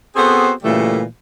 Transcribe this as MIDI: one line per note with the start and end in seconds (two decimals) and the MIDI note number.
0.16 0.51 59
0.16 0.51 60
0.16 0.51 66
0.16 0.51 68
0.16 0.51 69
0.16 0.51 72
0.63 1.01 46
0.63 1.01 49
0.63 1.01 52
0.63 1.01 55
0.63 1.01 57